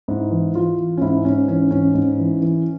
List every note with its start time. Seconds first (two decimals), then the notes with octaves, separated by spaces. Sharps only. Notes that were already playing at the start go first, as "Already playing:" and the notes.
0.08 G#2 E4
0.31 E3
0.54 E3 F4
0.79 E3
0.97 C#4
1.01 G#2 E4
1.25 G#2 C#4
1.48 E3 C#4
1.71 G#2 C#4
1.94 G#2
2.18 E3
2.41 E3